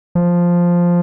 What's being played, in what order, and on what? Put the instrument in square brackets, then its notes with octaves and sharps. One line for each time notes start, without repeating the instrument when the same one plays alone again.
[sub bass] F3